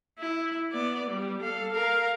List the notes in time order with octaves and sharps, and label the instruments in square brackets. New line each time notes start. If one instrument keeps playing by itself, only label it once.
[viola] E4
B3 D5
G3
A4 F5
A#4 F5